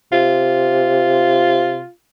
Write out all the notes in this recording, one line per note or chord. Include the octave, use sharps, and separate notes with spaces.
C3 F4